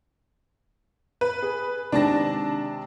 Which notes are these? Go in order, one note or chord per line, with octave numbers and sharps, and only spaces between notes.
B4
G#4
C3 D#3 G#3 D4 A5 A#6